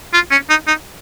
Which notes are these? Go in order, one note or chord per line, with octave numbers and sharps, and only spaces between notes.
F4
C#4
D#4
D#4